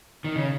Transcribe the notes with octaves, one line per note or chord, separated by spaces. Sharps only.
D#3
C#3